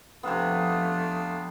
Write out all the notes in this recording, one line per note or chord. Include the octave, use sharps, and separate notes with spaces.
F2 C3 A3 B3 D4 F4